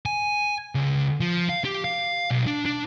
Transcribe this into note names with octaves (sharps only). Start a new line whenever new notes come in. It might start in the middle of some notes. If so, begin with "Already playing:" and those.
G#5
C#2
F3
F5
G4
F5
B1
D4
D4